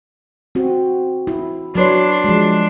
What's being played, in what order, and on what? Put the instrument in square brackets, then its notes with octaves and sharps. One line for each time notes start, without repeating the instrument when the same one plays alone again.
[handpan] C4 F#4
E4
[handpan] F#3 B4 C#5 [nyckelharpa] D4 C6
[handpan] F3 G#3